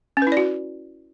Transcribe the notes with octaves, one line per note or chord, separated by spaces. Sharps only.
C#4
B4
E4
D5
F#4